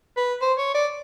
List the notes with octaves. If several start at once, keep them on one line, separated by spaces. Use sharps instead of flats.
B4
C5
C#5
D5